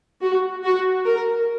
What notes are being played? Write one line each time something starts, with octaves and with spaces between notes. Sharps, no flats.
F#4
F#4
A#4